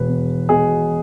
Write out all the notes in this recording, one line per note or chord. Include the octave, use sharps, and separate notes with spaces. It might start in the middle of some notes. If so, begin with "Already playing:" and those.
Already playing: E1 B4
E2
B2 G#4